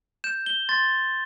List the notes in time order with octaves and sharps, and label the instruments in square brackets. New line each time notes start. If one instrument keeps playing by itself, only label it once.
[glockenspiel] G6 E7
G7
C6 A6